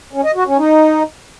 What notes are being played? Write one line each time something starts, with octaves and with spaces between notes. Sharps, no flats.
C#4
D#5
F#4
C#4
D#4